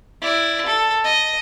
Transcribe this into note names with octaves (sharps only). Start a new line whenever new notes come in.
E4 D5
A4
D#5